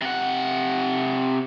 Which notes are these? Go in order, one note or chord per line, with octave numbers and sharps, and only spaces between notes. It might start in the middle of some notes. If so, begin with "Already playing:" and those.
C3 F#5